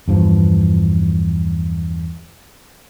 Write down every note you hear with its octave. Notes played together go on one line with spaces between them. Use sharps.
E2 G2 F3